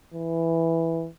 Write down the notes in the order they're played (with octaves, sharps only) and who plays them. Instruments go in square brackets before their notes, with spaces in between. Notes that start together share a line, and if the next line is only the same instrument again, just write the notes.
[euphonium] E3